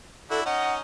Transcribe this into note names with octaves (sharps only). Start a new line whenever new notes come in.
D4 E4 F#4 A4
C#4 D#4 D#5 F#5